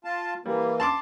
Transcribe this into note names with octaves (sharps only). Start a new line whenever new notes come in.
F4 A5
E3 G3 A#3
A5 C6 D6